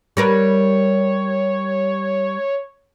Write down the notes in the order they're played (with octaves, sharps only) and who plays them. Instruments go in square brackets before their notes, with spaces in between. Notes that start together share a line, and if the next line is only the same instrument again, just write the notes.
[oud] G3 A#4 B4 [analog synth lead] C#5